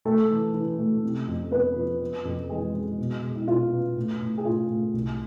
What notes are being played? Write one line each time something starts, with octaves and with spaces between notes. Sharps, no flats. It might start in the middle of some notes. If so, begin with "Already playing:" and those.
A3 A4
E3
E3
A3
C3
F2
B3 B4
F3
B3
F2
E3 G#3 G#4
G#3
B2
G#3
E4
B2 F4
B3
A2
A2
G#4
A2 F4
A2
C2